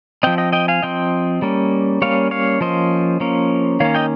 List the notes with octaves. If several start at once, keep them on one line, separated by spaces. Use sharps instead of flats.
F3 C4 D#5 G5
D#5 G5
D#5 G5
F5 G#5
F3 C4 D#5 G5
G3 A#3 C#4
G3 A#3 C#4 C#5 F5
C#5 F5
F3 A#3 C#4 C5 D#5
F3 A#3 C#4
D#3 A#3 C#4 C#5 F5
D#5 G5